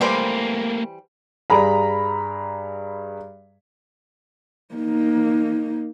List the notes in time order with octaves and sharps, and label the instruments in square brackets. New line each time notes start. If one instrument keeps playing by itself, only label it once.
[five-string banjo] E3 G3 C5 [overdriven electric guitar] A3 A#3
[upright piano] G2 G#4 A#5 B5
[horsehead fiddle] A#3 D#4